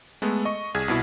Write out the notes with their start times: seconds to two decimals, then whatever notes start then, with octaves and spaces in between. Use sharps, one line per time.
0.22 G#3 A3 B3 A4
0.45 D#5 C#6
0.74 C2 G#4 G#6
0.88 C2 B2 E4